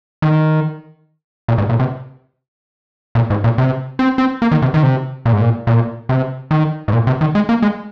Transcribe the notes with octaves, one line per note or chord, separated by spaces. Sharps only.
D#3
A#2
G#2
A#2
C3
A#2
G#2
A#2
C3
C4
C4
A#3
D#3
C3
D#3
C3
A#2
G#2
A#2
A#2
C3
D#3
G#2
A#2
C3
D#3
G#3
A#3
G#3